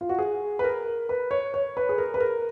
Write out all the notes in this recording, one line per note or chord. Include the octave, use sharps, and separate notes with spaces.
F4
F#4
G#4
B4
A#4
B4
C#5
C#5
B4
G#4
A#4
B4
A#4